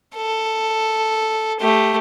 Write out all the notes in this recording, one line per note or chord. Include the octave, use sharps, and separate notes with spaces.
A4
A3 G4